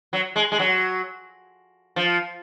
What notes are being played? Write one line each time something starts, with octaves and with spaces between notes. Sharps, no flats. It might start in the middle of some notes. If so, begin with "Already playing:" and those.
F#3
G#3
G#3
F#3
F3